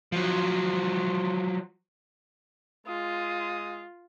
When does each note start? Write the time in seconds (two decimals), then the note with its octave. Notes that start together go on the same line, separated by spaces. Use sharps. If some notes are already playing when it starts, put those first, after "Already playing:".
0.12 F3 F#3
2.87 G#3 F4 D#6